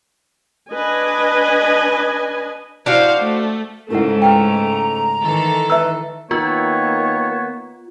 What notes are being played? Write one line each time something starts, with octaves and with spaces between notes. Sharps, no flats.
D4 B4 D#5 G#5
D4 E4 F#4 C5 F5
A3
G#2 C#3 A3 D#4 E4 A#4 F#5
B4 F5 G5 A#5
D#3 E3 A4
B4 E5 A#5 E6
D#3 A#3 B3 F4 C#5 E6